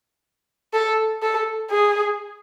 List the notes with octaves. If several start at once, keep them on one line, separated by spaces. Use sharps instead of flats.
A4
A4
G#4